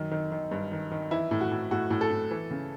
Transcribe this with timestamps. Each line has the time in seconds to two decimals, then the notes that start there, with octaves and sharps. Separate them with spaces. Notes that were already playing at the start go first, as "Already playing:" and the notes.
Already playing: F#2 D#3
0.11 D#3
0.32 D#3
0.51 G2
0.72 D#3
0.91 D#3
1.11 E3 E4
1.31 A2
1.41 F#4
1.51 A2
1.71 A2 F#4
1.91 A2
2.01 A4
2.11 A2
2.31 E3
2.51 C#3